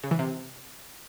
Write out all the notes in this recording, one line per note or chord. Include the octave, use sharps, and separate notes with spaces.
C#3
E3
C3